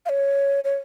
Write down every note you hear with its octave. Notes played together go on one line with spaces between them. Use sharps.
F5
C#5
C#5